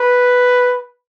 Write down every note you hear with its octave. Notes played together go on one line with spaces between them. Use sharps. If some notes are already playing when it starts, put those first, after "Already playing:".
Already playing: B4